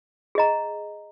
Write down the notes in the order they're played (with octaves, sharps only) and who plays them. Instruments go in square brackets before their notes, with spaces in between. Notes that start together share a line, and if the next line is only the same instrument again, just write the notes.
[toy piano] G#4 D#5 A#5